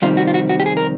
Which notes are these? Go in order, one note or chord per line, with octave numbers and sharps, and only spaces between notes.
F2 C3 D#3 G3 C4 F4
F#4
F4
F#4
F#4
G4
G#4
A#4